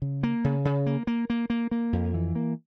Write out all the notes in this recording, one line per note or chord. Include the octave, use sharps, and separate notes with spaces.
C#3
A#3
C#3
C#3
A#3
A#3
A#3
A#3
A#3
F2
E3
A#3